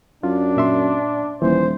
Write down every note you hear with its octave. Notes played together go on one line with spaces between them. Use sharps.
F#2 D4 F4
A#2 E5 C6
D#1 E3 C5